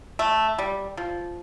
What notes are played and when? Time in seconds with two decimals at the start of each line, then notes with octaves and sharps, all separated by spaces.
0.19 A3
0.58 G3
0.97 F3